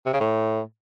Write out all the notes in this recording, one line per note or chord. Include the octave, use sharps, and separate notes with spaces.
C3
C#3
A2